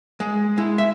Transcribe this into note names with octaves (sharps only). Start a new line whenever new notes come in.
G#3
G#3 E4
E5